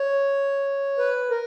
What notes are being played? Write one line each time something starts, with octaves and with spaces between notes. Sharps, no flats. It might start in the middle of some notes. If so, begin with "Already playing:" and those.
Already playing: C#5
B4
A#4